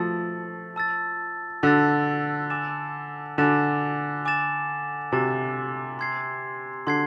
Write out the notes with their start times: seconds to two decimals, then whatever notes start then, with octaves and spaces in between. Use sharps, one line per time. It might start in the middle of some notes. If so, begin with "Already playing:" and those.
Already playing: F3 A3 A5 E6 A6
0.76 A5 E6 A6
1.63 D3 A5 E6 A6
2.50 G#5 D6 A6 E7
3.38 D3 G#5 D6 A6 E7
4.25 G#5 D6 A6 E7
5.12 C3 G#5 D6 A6 E7
5.99 C6 G#6 C7
6.87 D3 C6 G#6 C7